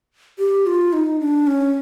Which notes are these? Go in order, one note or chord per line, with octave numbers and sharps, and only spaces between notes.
G4
F4
D#4
D4
C#4